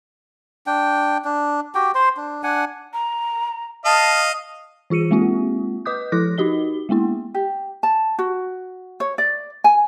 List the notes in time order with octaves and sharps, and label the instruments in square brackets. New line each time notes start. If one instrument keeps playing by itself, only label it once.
[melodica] D4 G5
D4
F#4 G4 G5
C5 C6
D4
D4 F#5 G#5
[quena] A#5
[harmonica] D#5 F5 [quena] A5
[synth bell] E3 F4 G#4 C#7 D#7
G#3 A#3 C4 F4 G4
B4 D#5 D6 D#6 G6
F3 E4 A4 D6 F#6 A#6
D#4 F#4 G4 D#5 G7
G#3 A#3 B3 E4
[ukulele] G4
A5
F#4
C#5
D5
G#5